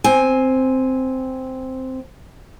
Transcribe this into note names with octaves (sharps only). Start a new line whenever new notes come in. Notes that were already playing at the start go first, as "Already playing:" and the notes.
C4 G#5